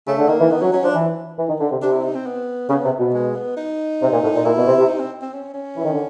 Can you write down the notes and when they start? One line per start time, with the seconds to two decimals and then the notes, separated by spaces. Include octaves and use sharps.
0.07 C#3 A3
0.18 D3
0.29 D#3 A#3
0.40 E3
0.50 D#3 B3
0.62 F#3 C#4
0.72 F#3 C#4
0.83 F3 D4
0.95 E3
1.38 E3
1.49 D#3
1.60 D3
1.71 C3
1.82 C3 D4
1.93 E4
2.04 D#4
2.15 C4
2.26 B3
2.69 C#3 B3
2.84 C3
2.99 B2
3.14 G#3
3.35 B3
3.57 D#4
4.02 C3
4.12 A#2
4.23 A2
4.34 A#2
4.45 A#2 E4
4.56 B2
4.67 C3
4.78 C3
4.88 D#4
4.99 C4
5.22 C4
5.33 C#4
5.54 C#4
5.77 E3
5.85 D#3
5.93 D3